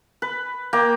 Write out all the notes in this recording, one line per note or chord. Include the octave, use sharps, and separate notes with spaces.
B4
A#3 G5